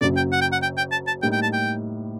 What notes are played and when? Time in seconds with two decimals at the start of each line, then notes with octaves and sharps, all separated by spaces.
0.01 F#1 F#2 F#3 D5
0.16 G5
0.32 F#5
0.41 G5
0.52 F#5
0.62 G5
0.77 G5
0.92 A5
1.07 A5
1.22 A2 G3 A#3 D#4 G5
1.32 G5
1.42 A5
1.53 G5